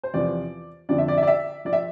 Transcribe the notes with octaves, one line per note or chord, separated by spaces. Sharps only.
C5
E2 C3 F3 D5
F2 D3 F3 D5
E5
D5
E5
D5
E5
F3 D5
E5